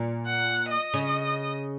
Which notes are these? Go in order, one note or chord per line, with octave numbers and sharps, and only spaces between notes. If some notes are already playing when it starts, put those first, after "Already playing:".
Already playing: A#2
F#5
D#5
C#3